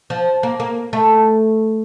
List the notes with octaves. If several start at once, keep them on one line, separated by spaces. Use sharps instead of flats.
F3
A#3
A#3
A3